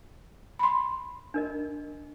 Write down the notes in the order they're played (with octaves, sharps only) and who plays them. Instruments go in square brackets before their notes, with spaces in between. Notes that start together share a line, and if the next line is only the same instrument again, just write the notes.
[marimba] B5 C6
[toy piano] D4 A#4 D#5